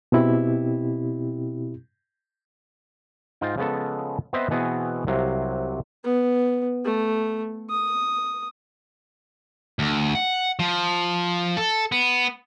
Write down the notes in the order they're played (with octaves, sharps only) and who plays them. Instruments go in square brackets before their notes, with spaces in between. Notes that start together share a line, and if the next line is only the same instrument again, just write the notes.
[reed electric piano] B2 C4 E4 G4
[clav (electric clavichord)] G#2 D#4 F4 G5
C#3 F3 G#3 B3 C#4 A4
B3 C4 B4 C5 D#5 E5
B2 E3 B3 C4 F#4 G#4
C2 C3 F#3 F5
[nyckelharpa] B3
A3
D#6
[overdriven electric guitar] D2
F#5
F3
A4
B3